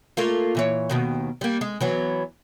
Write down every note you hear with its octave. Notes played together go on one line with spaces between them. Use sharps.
A3 A#3 F4
A#2 E3 C#5
D#2 B2 D#3
G3 A#3
G#3
E3 F#3 B3